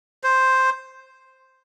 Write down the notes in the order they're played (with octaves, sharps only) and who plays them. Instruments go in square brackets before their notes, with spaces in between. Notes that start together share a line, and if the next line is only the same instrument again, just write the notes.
[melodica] C5